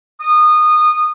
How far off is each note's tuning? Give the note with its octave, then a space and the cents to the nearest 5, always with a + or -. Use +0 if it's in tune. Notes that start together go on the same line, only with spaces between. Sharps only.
D#6 -20